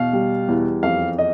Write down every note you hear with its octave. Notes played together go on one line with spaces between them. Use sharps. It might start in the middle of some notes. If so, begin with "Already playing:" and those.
Already playing: E2 B2 F5
G3
E2
F2 F5
D#5